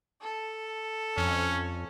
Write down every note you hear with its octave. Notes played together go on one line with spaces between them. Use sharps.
A4
F2 C#4